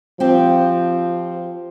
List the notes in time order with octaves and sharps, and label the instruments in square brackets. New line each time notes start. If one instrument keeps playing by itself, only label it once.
[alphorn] F3 [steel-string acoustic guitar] C4 G4